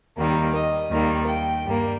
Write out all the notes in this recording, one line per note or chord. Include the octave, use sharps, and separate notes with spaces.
D#2 D#3 G3 A#3
D#5
D#2 D#3 G3 A#3
G5
G2 G3 A#3